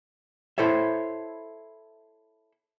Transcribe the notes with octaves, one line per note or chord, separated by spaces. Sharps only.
E4 A4 C5 C#5 E5